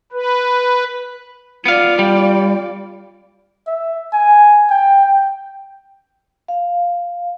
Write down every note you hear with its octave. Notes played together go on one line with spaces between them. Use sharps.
B4
B3 F4 D5 F5
G3
E5
G#5
G5
G5
F5